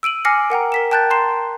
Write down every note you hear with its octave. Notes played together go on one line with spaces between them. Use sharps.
E6 D7 D#7 F#7
G#5 D6 F6 A#6 C7 C#7
A#4 F#5 G5 A#5
A#4 B6 E7
G5 A5 F#6 G6 A6
A#5 C6 C7 E7